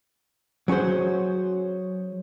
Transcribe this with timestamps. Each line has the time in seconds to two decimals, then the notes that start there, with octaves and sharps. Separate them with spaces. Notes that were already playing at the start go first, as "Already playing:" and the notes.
0.68 F#3 C#4 F#4 G#4 C5